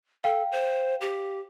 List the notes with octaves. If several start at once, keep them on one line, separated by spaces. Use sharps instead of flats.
A4 F5 G5
C5
G4